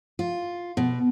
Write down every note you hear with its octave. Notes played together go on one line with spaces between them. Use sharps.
F4
B2